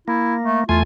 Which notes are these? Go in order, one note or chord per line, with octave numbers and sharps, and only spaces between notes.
A#3 E4
A3
E2 A3 F4 G#5